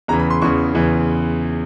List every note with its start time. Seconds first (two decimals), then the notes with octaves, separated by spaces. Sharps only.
0.08 E2 C#3 E3 A#5
0.20 B5
0.30 C6
0.42 E2 C#3 E3 C#6
0.74 E2 C#3 E3